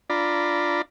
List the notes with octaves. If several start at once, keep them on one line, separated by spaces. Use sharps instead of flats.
D4 F4 D5 A#5 B5